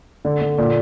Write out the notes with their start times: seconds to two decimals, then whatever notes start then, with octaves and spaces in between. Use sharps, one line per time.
0.25 D3
0.41 D3
0.58 A#2